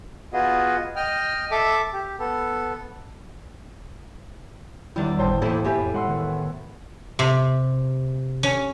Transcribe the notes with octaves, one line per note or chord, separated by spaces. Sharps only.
B3 F4 F#4 G#4 D#5
D#5 G5 F6
A4 E5 D6
G4
B3 A4
E2 D#3 E3 G3 D4 E4
G1 A2 C5 G5 A5
E1 D#3 A#3 E4 A4 D6 D#7
F2 A2 G4 B4 E5 G#5
G#3 F#5 C6 E6
D#3 B3
C3
C#4